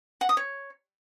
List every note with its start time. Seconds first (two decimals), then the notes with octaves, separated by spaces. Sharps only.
0.21 F#5
0.29 D#6
0.37 C#5